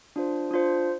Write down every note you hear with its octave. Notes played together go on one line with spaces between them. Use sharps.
D4 F4 C5
D4 F4 C5